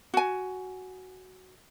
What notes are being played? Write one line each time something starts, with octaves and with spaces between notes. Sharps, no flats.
F#4 G#5